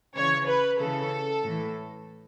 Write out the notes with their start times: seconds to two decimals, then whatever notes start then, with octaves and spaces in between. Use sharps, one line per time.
0.15 C#3 E3 C#5
0.48 B4
0.80 C#3 E3 A4
1.44 A2 E3